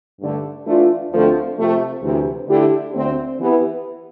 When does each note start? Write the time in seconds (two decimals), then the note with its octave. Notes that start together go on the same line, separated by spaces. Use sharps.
0.20 G2 D3 A3 D4
0.67 E3 A3 D4 F4
1.12 D2 D3 F3 A3 C4
1.58 C3 F3 A3
2.03 D2 C3 E3
2.49 D3 A3 E4 G4
2.94 D2 D3 A3 C4
3.40 E3 B3 E4 G4